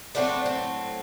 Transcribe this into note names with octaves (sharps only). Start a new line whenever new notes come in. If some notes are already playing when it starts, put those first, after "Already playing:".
A2 F#3 A3 C4 D4
C4